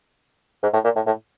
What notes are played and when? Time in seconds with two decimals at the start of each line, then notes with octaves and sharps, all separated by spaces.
0.63 G#2
0.73 A2
0.84 A#2
0.96 A2
1.06 A2